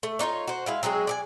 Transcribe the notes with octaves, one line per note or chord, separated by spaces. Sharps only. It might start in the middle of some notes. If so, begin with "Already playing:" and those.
A3
D4 D#4 F4 C#5
F#4 C5
G#3 E4 F5
F#3 G#3 C4 G#4
D5 D#5 G#5